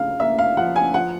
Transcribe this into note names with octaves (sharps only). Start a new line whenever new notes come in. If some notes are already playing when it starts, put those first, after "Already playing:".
Already playing: C#3 F5
A#3 E5
F5
F3 F#5
G#5
F3 F#5